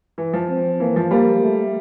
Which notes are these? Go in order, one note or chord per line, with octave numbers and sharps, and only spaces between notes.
E3
F3
C4
E3 A#3
F3
G3 A#3
A3